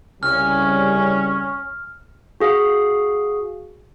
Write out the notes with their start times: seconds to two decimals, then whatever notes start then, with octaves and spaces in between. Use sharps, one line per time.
0.23 C2 C#3 G3 C#4 F6
2.40 F#4 G#4 F5